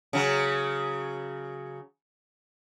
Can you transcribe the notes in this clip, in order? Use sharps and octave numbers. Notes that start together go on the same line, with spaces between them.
C#3 F#3